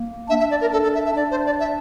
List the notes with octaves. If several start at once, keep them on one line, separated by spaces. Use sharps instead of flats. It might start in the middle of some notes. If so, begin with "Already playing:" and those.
Already playing: A#3
D4 E5
E5
D5
A#4
D4 A4
A4
E5
E5
D4 D5
C5
D5
E5